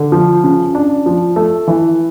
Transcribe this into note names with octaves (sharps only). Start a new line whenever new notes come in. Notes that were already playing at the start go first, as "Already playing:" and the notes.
Already playing: D3
F3
C#3
D4
F3
A3
E3